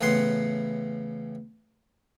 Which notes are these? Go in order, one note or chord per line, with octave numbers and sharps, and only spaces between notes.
A1 A2 C#3 B3 F#5 C6